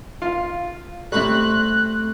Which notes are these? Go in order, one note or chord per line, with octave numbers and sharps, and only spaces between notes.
F4 F5
C3 G3 A3 C4 B5 F#6